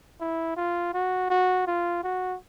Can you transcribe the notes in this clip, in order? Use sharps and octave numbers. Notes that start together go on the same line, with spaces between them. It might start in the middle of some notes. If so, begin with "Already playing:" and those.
E4
F4
F#4
F#4
F4
F#4